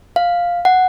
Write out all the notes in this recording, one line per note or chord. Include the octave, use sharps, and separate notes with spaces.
F5
F#5